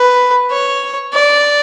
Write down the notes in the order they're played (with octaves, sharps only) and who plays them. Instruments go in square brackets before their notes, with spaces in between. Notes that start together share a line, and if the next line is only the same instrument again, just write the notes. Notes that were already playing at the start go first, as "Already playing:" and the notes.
Already playing: [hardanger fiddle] B4
C#5
D5